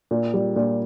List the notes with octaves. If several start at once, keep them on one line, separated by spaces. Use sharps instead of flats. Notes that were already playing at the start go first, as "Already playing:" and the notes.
A#2
G3
A#2